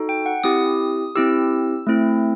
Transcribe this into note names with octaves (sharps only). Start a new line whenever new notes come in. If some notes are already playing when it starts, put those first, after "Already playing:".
Already playing: D#4 F#4 A4
G5
F#5
C4 E4 G4 D#6
C4 E4 G4 E6
A3 C4 E4